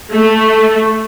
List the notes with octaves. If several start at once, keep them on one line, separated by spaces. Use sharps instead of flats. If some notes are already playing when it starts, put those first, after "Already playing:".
A3